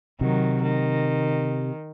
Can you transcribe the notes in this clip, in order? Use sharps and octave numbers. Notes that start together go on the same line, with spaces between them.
C3 D#3 F#3
D#3